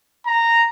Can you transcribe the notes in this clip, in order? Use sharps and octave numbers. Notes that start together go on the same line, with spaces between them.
A#5